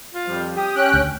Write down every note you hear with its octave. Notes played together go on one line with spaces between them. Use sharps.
F4
F2 F3 G3
G4 D#6
C#4 G5 F#6
D2